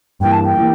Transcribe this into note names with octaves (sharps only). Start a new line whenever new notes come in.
G2 E3 A#3 G5
A5
G5
E3 A#3